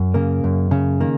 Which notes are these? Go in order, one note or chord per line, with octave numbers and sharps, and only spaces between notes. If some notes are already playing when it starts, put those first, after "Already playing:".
Already playing: F#2
C#3 A#3
F#2
C#3
D#3 A#3